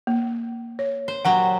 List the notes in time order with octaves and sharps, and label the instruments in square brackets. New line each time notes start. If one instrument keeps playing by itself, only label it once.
[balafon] A#3
C#5
[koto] C5
[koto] A#2 F#3 G4 [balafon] F#5